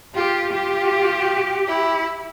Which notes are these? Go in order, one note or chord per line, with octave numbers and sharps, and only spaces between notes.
F4 G4
F4 G4
E4